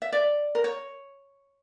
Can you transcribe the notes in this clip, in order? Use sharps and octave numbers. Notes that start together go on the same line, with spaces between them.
E5
D5
A#4
C#5